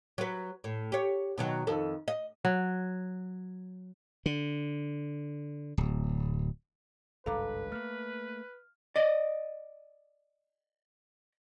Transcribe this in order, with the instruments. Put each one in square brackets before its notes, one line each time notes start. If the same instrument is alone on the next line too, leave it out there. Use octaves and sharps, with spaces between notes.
[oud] F#3 B4
A2
G4 C#5
B2 D#3 F#3
F2 D#3 A4
D#5
[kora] F#3
[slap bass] D3
D1
[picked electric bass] G#1 C#2 G2 [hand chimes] A4 [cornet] B4 [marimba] F5 A#5 D6
[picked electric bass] A3 A#3 [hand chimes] F6
[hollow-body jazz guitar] D5 D#5